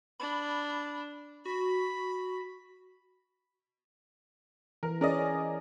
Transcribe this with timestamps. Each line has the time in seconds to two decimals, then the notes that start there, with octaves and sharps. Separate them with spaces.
0.20 D4 B5
1.45 F#4 B5
4.83 E3 A#4
5.01 C#4 G#4 A#4 D5 D#5